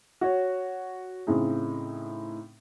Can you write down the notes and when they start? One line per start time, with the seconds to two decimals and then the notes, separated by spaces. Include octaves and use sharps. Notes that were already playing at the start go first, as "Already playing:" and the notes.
0.21 F#4 C#5
1.27 A2 C#3 C4 D#4 G#4